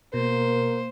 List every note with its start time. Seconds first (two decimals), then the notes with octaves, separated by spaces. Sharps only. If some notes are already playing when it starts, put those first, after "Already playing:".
0.14 B2 A#3 A#4 C5